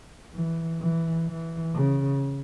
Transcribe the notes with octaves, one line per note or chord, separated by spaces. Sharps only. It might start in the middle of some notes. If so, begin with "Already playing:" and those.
E3
E3
E3
C#3